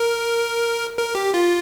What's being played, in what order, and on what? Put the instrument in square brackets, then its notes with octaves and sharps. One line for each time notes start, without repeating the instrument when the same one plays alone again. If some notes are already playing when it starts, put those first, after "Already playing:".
Already playing: [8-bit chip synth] A#4
A#4
G4
F4